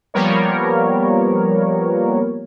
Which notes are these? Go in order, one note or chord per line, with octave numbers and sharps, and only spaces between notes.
F3 G3 A#3 B3 A#4 C#5